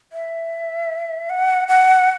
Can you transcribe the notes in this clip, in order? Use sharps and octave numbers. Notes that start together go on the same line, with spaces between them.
E5
F#5
F#5